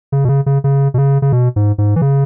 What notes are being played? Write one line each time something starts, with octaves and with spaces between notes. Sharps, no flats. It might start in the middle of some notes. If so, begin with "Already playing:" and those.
C#3
B2
C#3
C#3
C#3
B2
C#3
C#3
B2
G#2
G#2
E3
C#3